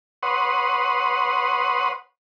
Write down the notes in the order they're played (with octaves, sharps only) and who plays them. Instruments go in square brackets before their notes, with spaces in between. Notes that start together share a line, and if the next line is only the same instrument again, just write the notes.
[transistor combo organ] B4 C#5 F#5 C6 D#6